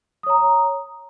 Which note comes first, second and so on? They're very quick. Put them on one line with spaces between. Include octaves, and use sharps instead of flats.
D#6 C#5 A#5